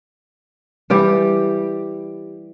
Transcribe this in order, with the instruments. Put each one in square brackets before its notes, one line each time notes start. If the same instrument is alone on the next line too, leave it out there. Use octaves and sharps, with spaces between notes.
[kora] E3 G3 E4 G4